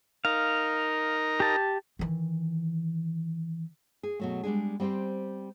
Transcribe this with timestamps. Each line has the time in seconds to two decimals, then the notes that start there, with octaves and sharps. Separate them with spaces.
0.25 D#4 A#4 F5
1.40 G4 A5
1.99 D#3 E3
4.03 G#4
4.20 B2 F#3 A3
4.43 G3 G#3 D4 G#4
4.80 G3 C4 E4 G4 C5